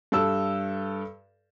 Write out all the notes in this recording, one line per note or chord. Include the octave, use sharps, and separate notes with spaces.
G2 A4 E6